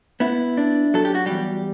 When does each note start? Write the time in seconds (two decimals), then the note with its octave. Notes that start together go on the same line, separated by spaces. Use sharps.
0.20 B3 E4
0.57 D4
0.94 F#3 A4
1.05 G4
1.15 F#4
1.26 E2 G3 G4